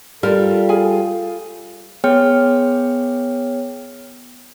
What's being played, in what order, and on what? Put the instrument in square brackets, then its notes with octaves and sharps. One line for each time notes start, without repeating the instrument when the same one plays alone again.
[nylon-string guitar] G3 [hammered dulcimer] F4 F5 [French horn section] A4 [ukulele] A#4
[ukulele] G#4 G#5
[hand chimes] B3 G#4 C#5 G5 F6